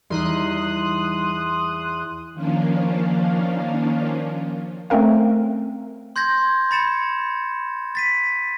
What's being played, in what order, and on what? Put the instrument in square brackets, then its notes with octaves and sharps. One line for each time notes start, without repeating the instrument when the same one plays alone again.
[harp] E2 [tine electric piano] G3 D#4 [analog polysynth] C6 D#6 F#6
[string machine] D#3 F3 A#3 C#4 D4 F4
[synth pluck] A3 C4 C#4 A#4 F5
[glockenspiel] C6 G6 G#6 A#6
B5 A6 C#7 E7
A6 B6 D#7